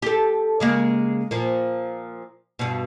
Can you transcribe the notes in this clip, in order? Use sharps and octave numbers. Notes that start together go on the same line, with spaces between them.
G4 A4
C#3 G#3 A#3
A#2 F3
G2 B2